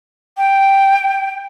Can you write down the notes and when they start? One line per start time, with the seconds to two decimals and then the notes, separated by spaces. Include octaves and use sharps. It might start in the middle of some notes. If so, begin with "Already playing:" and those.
0.37 G5